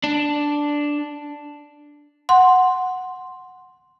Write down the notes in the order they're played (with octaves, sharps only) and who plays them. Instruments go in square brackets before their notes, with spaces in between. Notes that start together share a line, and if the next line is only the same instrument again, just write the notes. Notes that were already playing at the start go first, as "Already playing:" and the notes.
[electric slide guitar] D4
[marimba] F#5 C6